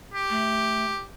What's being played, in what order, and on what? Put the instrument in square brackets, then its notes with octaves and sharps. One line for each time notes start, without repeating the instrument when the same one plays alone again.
[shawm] G4
[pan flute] A3